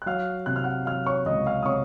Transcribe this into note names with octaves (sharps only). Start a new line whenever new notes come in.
F#6
F#3 F5 F6
C3 F#6
F6
F#5 F#6
F#3 F5 F6
C#5 C#6
C#2 D#5 D#6
F5 F6
D#6
C3 C#5 C#6